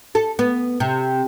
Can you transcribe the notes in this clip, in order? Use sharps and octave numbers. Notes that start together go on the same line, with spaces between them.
A4
B3
C3